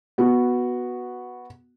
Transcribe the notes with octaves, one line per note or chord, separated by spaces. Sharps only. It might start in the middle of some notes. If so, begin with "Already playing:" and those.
B3 F#4